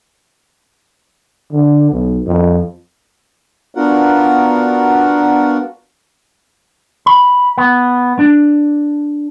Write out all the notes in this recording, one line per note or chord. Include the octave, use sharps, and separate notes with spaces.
D3
B1
F2
B3 D4 F4 F#4 A#4 F#5
B5
B3
D4